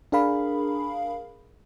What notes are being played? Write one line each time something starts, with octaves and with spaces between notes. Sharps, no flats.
D4 G#4 A#4 F5 B5